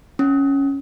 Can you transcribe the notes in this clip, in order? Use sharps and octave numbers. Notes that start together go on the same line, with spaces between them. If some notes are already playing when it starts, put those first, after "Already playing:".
C#4